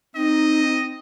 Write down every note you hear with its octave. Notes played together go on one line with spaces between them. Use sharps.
C4 D#4 D#5